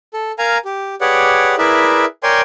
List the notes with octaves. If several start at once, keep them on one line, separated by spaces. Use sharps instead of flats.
A4
A#4 F5 G#5 A#5
G4
G4 G#4 B4 C#5 D5 F#5
E4 G#4 A#4 B4 D5 E5
A#4 C#5 D5 G5 G#5 C6